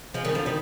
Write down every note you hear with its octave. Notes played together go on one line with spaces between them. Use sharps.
F3 G#3
D#3 G3
D3 F3
D#3 G3